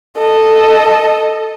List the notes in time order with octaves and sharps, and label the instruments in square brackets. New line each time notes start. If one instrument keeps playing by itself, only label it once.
[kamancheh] A4 D#5